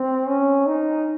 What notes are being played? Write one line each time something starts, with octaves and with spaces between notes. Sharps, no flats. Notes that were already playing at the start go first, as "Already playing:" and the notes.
Already playing: C4
C#4
D#4